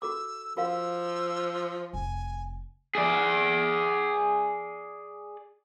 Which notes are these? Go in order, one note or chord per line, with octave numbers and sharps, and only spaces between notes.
F#4 A4 D6 E6
F3 F#4 A#4 F5 E6
F1 G#5
G#4 D5